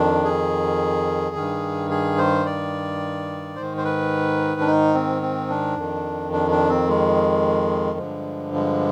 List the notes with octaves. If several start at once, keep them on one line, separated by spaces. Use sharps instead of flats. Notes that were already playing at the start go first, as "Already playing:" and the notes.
Already playing: F2 D#3 D4
G#4
G2 D#3
G#4
C5
D5
G#2 D#3 C5
C5
B4
D4
D#4
C4
C4
D4
F2 D#3
D4
D4
C4
G#3
G2 D3 F3 G#3
G#3